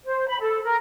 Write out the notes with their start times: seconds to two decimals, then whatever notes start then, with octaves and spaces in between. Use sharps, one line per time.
0.04 C5
0.28 B5
0.40 A4
0.64 A#4